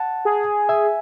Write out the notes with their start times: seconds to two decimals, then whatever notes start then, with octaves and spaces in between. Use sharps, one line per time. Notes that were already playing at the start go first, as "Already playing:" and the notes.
Already playing: F#5 A5
0.25 G#4
0.69 E5 G#5